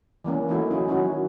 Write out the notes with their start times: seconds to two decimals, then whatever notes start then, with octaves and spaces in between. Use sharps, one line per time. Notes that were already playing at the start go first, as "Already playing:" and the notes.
0.24 E3 G3 A#3 C#4
0.48 E3 A3 A#3 D#4 E4 F#4
0.70 F#3 C#4 D#4 E4 G#4
0.88 D#3 F#3 C#4 E4 F#4